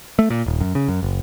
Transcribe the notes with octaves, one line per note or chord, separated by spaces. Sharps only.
A3
A#2
D#1
F#2
C#3
F#2
F#1